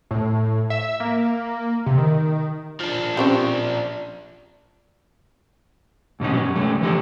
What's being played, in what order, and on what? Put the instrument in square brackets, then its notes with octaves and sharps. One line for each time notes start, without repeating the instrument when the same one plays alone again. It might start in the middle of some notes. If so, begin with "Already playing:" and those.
[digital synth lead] A2
E5
A#3
C3
D#3
[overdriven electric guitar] F3 D4
[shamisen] C4 C#4 G4
[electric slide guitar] G#2 B2 C#4 D#4
G2 F#3
C#3 G#3 A3
E3 F3 D#4 G4 A4 D#5